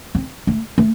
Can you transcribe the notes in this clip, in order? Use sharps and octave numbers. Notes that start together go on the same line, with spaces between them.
C4
A3
A3